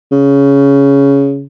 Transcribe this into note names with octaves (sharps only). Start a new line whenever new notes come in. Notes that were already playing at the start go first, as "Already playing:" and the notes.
C#3